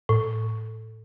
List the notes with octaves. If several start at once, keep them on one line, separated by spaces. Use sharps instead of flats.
A2